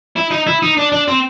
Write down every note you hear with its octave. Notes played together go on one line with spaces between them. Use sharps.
E4
D#4
E4
D#4
D4
D4
C4